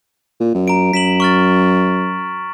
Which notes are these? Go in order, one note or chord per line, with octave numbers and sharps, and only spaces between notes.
A#2
F#2
A#5 D7
F#2 B6 E7 F#7
C#6 F6 A6